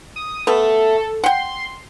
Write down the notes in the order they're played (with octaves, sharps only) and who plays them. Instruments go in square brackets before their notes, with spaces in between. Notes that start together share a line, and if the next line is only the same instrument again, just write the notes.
[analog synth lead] D#6
[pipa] A3 B3 [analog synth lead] A4
[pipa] F#5 G5 [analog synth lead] C6